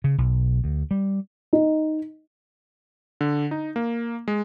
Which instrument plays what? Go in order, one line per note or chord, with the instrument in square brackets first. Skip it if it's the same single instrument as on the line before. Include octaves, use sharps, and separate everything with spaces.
[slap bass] C#3
B1
D2
G3
[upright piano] D#4
[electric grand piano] D3
D#4
A#3
G#3